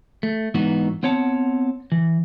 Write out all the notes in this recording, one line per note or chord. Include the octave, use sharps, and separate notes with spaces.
A3
G#2 E3 B3 D#4 F#4
B3 C4 C#5 F#5 A5
E3